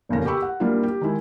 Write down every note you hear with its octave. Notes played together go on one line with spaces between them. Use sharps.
F1 D#2 C#3 A#6
G4 G5 B5 C#6 E6
F#5
G3 A#3 D4 E4 F4
G4
D#3 G#3 E4